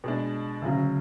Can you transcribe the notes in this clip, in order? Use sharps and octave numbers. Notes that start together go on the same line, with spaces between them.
B2 G#3 D4
D2 C#3 F#3